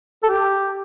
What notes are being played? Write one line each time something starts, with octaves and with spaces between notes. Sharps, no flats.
A4
G4